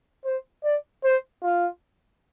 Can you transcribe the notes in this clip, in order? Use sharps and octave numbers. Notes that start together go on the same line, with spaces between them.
C5
D5
C5
F4